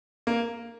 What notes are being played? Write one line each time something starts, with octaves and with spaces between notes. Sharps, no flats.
A#3